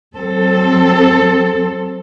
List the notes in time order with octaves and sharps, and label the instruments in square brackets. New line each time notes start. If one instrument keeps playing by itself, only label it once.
[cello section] F#3 C4 A4